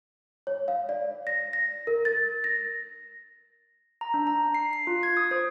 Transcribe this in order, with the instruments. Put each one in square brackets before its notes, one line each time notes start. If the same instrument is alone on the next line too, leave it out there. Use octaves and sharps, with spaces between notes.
[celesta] C#5
F5
D5
A#6
A#6
A#4
A6
A#6
[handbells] A#5
D4
A#5
C7
C7
F4
G#6
D#6
C5